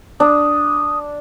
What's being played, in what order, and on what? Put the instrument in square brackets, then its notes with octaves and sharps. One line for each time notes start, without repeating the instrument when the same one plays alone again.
[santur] D4 [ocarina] D#6